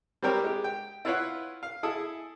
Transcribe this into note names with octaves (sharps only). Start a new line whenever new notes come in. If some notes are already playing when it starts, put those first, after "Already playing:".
G3 C4 G4 A#4 C#5 G5
G#3 G4
G5
E4 F4 B4 C#5 F5 F#5
F5
E4 G#4 A4 D#6